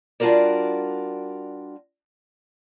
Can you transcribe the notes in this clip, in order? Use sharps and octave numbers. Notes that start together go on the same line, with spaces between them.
G3 D4 F4 F#4 A#4 D5